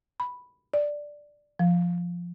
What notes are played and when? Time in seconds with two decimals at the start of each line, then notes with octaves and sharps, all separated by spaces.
0.20 B5
0.74 D5
1.59 F3